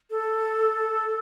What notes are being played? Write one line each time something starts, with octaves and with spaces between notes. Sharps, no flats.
A4